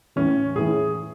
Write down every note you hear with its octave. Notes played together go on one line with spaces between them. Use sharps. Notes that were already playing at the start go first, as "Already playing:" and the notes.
A2 E3 C#4
A2 E3 G#4